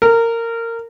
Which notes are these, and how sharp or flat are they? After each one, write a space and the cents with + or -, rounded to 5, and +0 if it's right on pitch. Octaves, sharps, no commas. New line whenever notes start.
A#4 -20